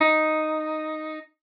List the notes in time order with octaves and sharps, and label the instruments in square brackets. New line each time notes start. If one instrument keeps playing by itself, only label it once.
[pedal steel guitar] D#4